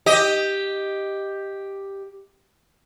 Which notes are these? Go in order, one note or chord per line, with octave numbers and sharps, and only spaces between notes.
G4 D#5